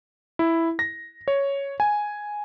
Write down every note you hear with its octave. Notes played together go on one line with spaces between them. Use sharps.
E4
A#6
C#5
G#5